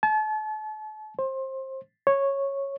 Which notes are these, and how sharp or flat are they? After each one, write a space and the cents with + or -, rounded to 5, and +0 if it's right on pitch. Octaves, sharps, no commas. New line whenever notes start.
A5 -35
C5 +25
C#5 -10